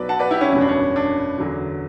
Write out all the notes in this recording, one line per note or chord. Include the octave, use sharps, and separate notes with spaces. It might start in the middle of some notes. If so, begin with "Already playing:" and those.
Already playing: B1 B2 F#3 B4 D5
F#5 A5
B4 D5
E4 G4
C#4 E4
F#1 E2 B2 G3 C#4
D4
C#4
D4
E2 D3 F#3